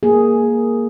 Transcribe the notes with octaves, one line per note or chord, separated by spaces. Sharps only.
A#3 G#4